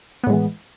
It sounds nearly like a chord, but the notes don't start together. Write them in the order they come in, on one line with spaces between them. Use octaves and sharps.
B3 A2 G#3 E3